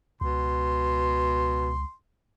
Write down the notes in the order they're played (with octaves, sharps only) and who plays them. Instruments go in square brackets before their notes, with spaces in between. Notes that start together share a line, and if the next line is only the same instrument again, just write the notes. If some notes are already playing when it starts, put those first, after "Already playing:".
[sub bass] C#2 [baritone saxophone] B2 [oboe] C6